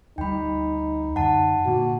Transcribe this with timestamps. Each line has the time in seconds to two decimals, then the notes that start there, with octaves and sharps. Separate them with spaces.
0.18 D2 G3 D#4 G5 B5
1.16 F#2 D3 F#5 A5
1.66 A#2 D3 A#3 F#4